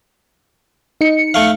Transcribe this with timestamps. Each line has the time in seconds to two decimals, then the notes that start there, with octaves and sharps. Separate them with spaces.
1.01 D#4 C#7
1.34 A3 F5